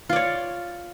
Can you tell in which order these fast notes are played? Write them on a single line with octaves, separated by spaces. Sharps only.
F4 D5 C#5